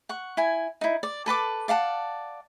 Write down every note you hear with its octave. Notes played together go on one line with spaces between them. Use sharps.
F#5 C#6
E4 G#5
D#4 E4
D5
A4 B4 A5 D6
D5 F5 F#5 A5